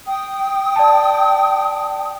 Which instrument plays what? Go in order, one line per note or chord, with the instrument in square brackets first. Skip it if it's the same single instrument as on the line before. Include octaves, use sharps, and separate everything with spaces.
[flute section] G5 D#6
[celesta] D5 A5